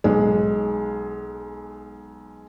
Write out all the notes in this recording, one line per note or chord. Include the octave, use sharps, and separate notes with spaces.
B1 G#3